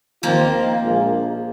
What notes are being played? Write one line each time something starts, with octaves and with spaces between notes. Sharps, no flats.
D#2 D#3 F3 A#3 C4 F4
A#1 A#2 G#3 F4